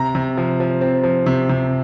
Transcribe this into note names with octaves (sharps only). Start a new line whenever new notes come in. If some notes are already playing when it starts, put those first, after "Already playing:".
Already playing: C3 A#5
C3
F3
F3
C4
F3
C3
C3